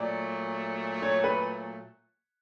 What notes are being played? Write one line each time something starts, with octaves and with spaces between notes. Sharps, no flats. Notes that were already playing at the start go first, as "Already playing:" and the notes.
Already playing: A#2 F#3 A3 D5
C#5
B4